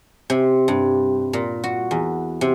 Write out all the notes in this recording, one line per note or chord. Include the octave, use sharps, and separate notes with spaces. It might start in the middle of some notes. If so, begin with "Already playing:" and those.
C3
G2
A#2
F#4
E2
C3